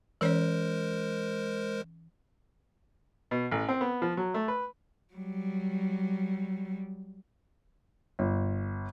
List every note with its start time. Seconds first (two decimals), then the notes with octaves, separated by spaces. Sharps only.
0.21 E3 G#3 C#4 A#4 C5 C#5
3.31 B2
3.51 A1
3.69 C4
3.81 B3
4.02 F3
4.17 F#3
4.34 A3
4.48 B4
5.14 F#3 G3
8.19 G1